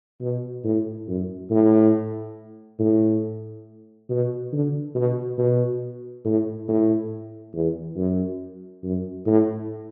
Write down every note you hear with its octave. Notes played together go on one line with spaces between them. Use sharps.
B2
A2
F#2
A2
A2
B2
D3
B2
B2
A2
A2
E2
F#2
F#2
A2